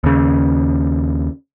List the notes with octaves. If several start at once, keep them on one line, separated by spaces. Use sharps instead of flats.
D#2 C#3